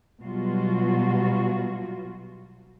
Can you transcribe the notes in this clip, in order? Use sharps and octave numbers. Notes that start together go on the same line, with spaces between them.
B2 F#3 G3 F4 F#4